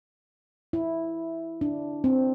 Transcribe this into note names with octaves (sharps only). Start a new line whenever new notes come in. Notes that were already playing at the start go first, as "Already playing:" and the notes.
E4
D4
C4